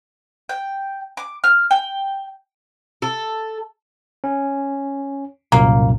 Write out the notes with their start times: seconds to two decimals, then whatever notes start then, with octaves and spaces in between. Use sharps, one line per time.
0.49 G5
1.17 D6
1.44 F6
1.71 G5
3.02 A4
4.24 C#4
5.52 C2 F#2 A#2 A#3